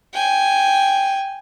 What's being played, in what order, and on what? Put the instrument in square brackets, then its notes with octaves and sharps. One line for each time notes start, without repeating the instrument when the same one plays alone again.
[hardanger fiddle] G5 G#5